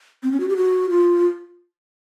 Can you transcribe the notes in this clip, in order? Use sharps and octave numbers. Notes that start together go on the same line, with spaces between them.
C4
C#4
F#4
G4
F#4
F4